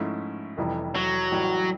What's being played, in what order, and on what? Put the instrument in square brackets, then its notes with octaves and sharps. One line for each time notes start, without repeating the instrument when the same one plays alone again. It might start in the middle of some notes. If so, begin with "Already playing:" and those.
Already playing: [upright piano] G#2 F3 A3 C#4 E4
F1 F2 C3 E3 G3
[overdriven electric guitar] F#3
[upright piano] A1 A2 E3 G3